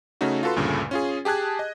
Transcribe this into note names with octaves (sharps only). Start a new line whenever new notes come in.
C#3 A3 C#4 D#4 F#4
F4 F#4 A4 B4 C6
D2 G2 A#2 C#3 A3
C#4 F4 G#4
G4 G#4 A5 F#6 G#6
D#5